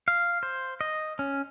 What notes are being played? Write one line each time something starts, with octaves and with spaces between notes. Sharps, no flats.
F5
C5
D#5
C#4